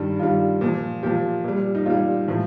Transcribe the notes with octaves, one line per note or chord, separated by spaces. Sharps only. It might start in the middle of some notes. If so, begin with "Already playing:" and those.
Already playing: G2 D#3 G3
G2 D#3 G3 F4
A#2 F3
A#2 F3 G4
A#2 G3
D#4
A#2 G3 F4
A2 F3